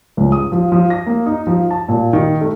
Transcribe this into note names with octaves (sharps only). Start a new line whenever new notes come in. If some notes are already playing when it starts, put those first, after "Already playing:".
C#2
D#6
F3
F3
A#6
A#3
D#4
F3
A5
A#2
D#3
A3